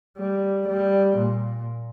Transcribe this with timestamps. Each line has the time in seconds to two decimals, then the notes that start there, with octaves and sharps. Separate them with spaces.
0.18 G3
0.68 G3
1.17 A#2